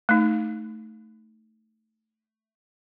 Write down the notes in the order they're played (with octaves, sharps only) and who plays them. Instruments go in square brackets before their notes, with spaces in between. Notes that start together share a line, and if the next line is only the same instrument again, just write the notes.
[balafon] A3 D#4